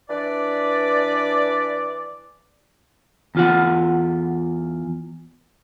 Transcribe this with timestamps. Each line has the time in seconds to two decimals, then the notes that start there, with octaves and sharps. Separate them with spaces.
0.09 E3 D4 B4 D5
3.35 E2 F4 F#5